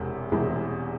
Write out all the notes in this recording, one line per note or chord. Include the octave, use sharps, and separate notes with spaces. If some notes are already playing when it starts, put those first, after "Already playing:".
Already playing: E1 E2 C3
E1 E2 C3